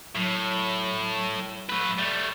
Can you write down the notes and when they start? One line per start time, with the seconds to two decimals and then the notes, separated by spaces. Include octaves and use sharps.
0.15 A2 F#3
1.69 A3 B4
1.98 G3 A3